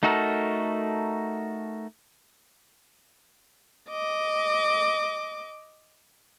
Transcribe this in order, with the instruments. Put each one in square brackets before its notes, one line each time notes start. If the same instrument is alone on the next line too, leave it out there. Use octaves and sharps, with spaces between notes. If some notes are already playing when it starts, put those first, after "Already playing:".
[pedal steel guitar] A3 D#4 F#4 A4 A#4
[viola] D#5 D6